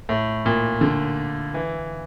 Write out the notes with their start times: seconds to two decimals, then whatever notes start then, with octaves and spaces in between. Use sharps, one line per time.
0.09 A2
0.46 A#2
0.81 D3
1.54 E3